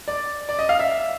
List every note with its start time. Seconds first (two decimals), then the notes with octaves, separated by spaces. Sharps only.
0.08 D5
0.49 D5
0.59 D#5
0.69 F5
0.80 E5